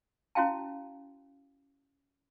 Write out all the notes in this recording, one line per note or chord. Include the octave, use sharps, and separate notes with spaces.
C#4 E4 F#4 F5 G5 A5